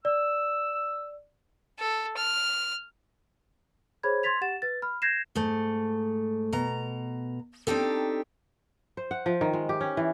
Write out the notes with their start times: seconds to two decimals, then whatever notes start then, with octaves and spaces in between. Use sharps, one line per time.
0.05 D5 E6
1.79 A4
2.17 F6
4.03 G#4 C5 C#5 B5 G#6
4.23 C6 G#6 A6 B6 F7
4.41 G4 F#5 A6 E7
4.62 B4 A6
4.82 B5 F6
5.02 G6 G#6 A#6 C7 E7
5.35 G#2 A3
6.53 B2 A#5
7.67 C4 D4 D#4 G4 A4
8.97 C5
9.11 F#5
9.26 F3
9.41 D#3
9.53 G#3
9.69 G4
9.81 C#4
9.97 E3